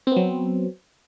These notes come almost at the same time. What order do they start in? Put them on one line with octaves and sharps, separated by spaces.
C4 B3 F#3